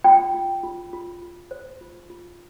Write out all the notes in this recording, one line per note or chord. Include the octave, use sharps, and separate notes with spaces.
F4 G5
F4
F4
F4
F4
C5
F4
F4